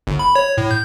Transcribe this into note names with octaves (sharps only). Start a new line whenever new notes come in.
G1
B5
C#5
A2
G6